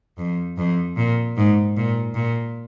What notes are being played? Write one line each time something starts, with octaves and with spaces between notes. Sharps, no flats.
F2
F2
A#2
G#2
A#2
A#2